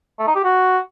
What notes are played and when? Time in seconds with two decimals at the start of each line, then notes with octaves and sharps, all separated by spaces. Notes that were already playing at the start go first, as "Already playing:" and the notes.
0.19 A3
0.27 D#4
0.36 G4
0.44 F#4